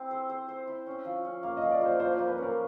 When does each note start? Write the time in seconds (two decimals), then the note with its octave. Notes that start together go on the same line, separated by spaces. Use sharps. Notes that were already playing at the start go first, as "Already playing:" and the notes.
Already playing: C4 E4
0.11 C5
0.29 C5
0.49 C5
0.67 E4
0.87 C#4
1.05 F3
1.25 C#4
1.43 A#3 F5
1.57 F3 D#5
1.71 D5
1.81 A#3 C5
2.00 F3 C5
2.14 A#3 C5
2.28 B4
2.38 C#4 A#4